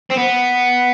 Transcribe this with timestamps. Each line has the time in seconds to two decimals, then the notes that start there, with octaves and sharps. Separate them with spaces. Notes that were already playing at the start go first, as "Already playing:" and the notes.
0.10 C4
0.17 B3